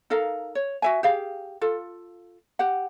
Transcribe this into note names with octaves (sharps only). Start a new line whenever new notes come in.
D#4 A4 A#4 F5
C#5
F#4 E5 G#5
G4 G#4 F5
F4 A4
G4 F#5